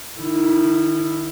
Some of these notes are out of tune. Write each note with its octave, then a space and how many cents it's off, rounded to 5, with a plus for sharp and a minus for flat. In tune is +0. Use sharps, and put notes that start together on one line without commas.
D#3 -25 E4 +0